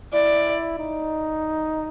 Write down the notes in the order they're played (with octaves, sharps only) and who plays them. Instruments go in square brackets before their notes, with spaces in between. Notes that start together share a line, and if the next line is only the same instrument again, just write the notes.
[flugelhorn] E4 [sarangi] D5
[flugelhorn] D#4